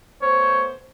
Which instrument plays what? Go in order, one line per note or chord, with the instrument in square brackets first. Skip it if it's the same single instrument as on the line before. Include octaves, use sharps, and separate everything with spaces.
[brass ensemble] A3 B3 C5 [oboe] C#5